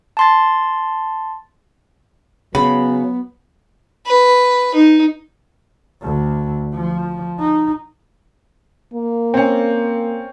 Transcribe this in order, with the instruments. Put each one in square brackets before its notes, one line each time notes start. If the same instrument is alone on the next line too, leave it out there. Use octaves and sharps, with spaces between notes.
[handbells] A5 C6 A6
[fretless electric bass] C#3 [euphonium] F#3 [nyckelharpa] B3 [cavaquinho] B5
[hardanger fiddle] B4
D#4
[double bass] D2
F3
D#4
[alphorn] A#3
[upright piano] C4 C#4